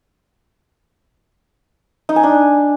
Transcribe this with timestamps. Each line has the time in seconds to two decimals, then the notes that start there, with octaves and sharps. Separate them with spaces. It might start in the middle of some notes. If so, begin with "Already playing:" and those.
2.09 D#4
2.16 G#5
2.23 D4